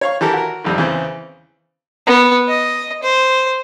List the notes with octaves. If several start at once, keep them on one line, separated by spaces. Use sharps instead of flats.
C#5 F5 C#6
E3 G4 A4 A#4
F#4 A#4
G#1 F2 G3
E2 C#3 C4
B3
D#5
C5